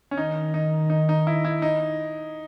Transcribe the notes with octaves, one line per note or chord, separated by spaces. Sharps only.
C#4
D#3 D#4
D#4
D#4
D#4
E4
E4
D#4